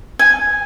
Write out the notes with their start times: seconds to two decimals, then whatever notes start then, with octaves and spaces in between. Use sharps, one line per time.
0.19 G#5